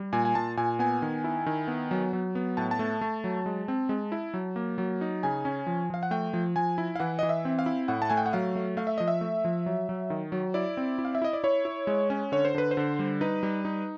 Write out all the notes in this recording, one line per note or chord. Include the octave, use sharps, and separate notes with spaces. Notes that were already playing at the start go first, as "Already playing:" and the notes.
Already playing: G3
A#2 G#5
G#5
A#2 A5
A#2 G#5
B3 G#5
D#3
E4
D#3
B3
F#3
F#3
B3
A2 A5
A5
A3
A3
F#3
G#3
C4
G#3
E4
F#3
A#3
F#3
D#4
C#3 G#5
C#4
F3
F3 F5
F#5
A3 G5
F3
F3 G#5
E4
F5
E3 F#5
E3 D#5
E5
C4
F5
E4
A2 F#5
A5
A3 G#5
G5
F#5
F#3 F5
A3
A3 F5
E5
F3 D#5
E5
A3
F3
F#3
F#3
D#3
F#3
E4 D5
C4
E4
F5
E5
E4 D#5
D5
E4 C#5
E4
G#3
C#4
D3 C#5
C5
D3 B4
C5
D3
G3
D#4 B4
G3
D#4